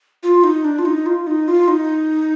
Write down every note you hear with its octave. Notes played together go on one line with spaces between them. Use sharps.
F4
D#4
D4
F4
D#4
F4
D#4
F4
D#4